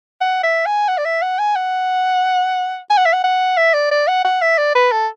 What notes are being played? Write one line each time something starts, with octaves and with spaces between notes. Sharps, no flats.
F#5
E5
G#5
F#5
D5
E5
F#5
G#5
F#5
G#5
F#5
E5
F#5
F#5
E5
D5
D5
F#5
F#5
E5
D5
B4
A4